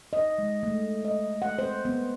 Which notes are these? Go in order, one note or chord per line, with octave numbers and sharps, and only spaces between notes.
D#5
G#3
A3
D#5
F#5
C5
B3